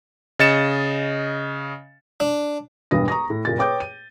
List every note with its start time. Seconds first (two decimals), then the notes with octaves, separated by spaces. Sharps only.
0.39 C#3 D#5 A6 C#7 E7
2.20 D4
2.91 E1 B1 G2 D#6 A#6
3.08 A#5 C#6 D#6 A#6
3.30 A2
3.45 F#1 A#2 A6
3.58 B4 C#5 G5 D6 D#6 G6
3.80 D#7